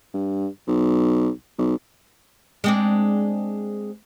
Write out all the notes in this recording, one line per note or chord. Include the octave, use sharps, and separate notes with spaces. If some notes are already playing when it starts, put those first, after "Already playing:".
G2
B1
B1
G#3 C4 D4